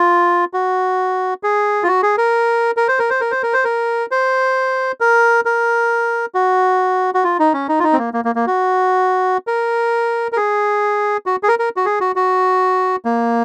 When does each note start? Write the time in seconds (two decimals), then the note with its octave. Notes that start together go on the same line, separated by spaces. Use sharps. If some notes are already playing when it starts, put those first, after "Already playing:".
Already playing: F4
0.53 F#4
1.43 G#4
1.83 F4
1.88 F#4
2.02 G#4
2.18 A#4
2.77 A#4
2.88 C5
2.99 A#4
3.10 C5
3.21 A#4
3.31 C5
3.43 A#4
3.53 C5
3.64 A#4
4.11 C5
5.00 A#4
5.45 A#4
6.35 F#4
7.14 F#4
7.24 F4
7.39 D#4
7.54 C#4
7.69 D#4
7.79 F4
7.83 D#4
7.93 C4
7.98 A#3
8.14 A#3
8.25 A#3
8.35 A#3
8.47 F#4
9.47 A#4
10.32 A#4
10.37 G#4
11.26 F#4
11.43 G#4
11.48 A#4
11.59 A#4
11.77 F#4
11.86 G#4
12.01 F#4
12.16 F#4
13.05 A#3